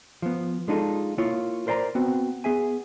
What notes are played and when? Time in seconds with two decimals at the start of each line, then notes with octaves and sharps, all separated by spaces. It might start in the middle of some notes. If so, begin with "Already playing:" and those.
0.22 F3 B3
0.68 G#3 D4 D#4 F4 A4
1.18 A#3 E4 F4 C#5
1.67 A#4 C5 D5 A5 A#5
1.95 B3 C4 F#4
2.44 B3 G#4 E5 G#5